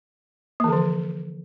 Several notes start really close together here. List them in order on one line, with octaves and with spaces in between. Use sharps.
A#3 E3 D3 F3